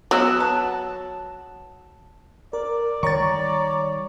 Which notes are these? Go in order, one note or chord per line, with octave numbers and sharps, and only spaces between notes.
F#3 B3 E6 F#6
A5
A#4 D5
D#3 G3 C#5 A#5 C#6 D6 A6